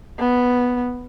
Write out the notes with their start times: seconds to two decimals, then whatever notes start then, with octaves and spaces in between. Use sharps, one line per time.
0.19 B3